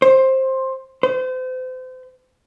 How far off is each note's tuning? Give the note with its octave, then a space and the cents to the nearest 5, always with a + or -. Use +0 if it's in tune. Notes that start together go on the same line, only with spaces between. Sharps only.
C5 +15
C5 -35